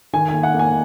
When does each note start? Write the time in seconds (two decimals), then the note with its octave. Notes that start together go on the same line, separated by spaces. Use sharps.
0.13 D#3 G#5
0.28 A#3 G#5
0.43 F#5
0.54 A#3
0.59 G#5